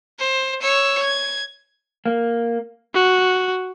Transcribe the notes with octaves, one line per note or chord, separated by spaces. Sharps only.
C5
C#5 E6
G#6
A#3
F#4